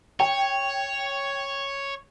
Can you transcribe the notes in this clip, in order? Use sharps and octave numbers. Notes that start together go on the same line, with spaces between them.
C#5 G5